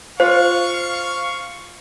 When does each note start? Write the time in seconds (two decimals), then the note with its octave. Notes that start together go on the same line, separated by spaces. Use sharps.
0.20 F4 C5 F5 C#6